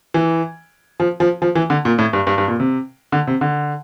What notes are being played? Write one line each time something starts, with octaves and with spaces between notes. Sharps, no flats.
E3
F3
F3
F3
E3
D3
A#2
A2
G2
G2
G2
A#2
C3
D3
C3
D3